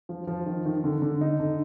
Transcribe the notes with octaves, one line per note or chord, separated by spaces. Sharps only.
F3
F3
D#3
D#3
D3
D3
D#4
D3